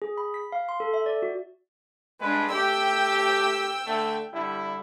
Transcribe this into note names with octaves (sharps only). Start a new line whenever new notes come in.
G#4
B5
B6
F5
C6
A4
E5
D5
F#4
G2 G#3 D4 B4
A3 G4 G5 E6
D3 A3
D3 G3 E4